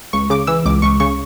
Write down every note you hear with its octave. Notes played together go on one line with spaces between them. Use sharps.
C#2 C#6
C#3 D6
E3 E6
C#2 D6
C#2 C#6
C#3 C#6